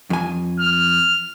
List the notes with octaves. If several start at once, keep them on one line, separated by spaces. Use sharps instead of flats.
F2 G#5
F6